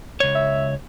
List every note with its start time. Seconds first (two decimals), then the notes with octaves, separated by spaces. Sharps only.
0.20 C#2 C#5
0.35 E5